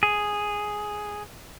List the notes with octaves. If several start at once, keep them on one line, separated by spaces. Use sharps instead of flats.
G#4